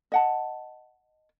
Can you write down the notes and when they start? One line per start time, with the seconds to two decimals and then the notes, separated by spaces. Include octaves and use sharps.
0.12 D#5 F#5 A5